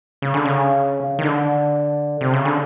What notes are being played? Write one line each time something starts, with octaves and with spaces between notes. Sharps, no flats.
C#3
D3
C#3
D#3
D3
C3
C#3
D3